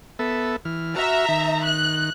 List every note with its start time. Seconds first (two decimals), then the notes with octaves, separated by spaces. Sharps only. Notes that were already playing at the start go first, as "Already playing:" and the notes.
0.19 B3 A4 E5
0.65 E3 F6
0.96 F#4 E5 A#5 E6 F6
1.28 D#3
1.65 F#6